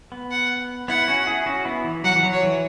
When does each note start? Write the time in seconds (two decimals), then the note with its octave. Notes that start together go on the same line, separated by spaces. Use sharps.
0.12 B3
0.31 F#5
0.88 B3 E4 F#5
1.08 C#4 F#4
1.27 E4 G#4
1.46 C#4 F#4
1.65 B3 E4
1.84 E3
2.04 F#3 F#5
2.15 E3
2.23 F#3
2.32 C#5
2.43 E3